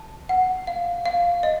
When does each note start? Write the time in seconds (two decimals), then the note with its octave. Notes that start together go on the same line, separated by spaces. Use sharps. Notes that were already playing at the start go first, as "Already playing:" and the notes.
Already playing: A5
0.29 F#5
0.67 F5
1.06 F5
1.43 D#5